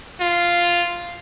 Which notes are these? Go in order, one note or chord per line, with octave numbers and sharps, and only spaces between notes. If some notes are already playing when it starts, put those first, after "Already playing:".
F4